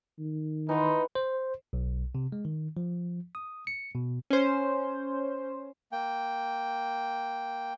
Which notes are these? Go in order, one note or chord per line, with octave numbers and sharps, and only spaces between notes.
D#3
E3 D#4 F#5 C6
C5
B1
C3
G#3
D#3
F3
D#6
C#7
B2
C#4 C5
A#3 G5